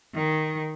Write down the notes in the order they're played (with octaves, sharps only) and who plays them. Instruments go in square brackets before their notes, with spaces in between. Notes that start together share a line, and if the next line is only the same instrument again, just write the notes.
[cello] D#3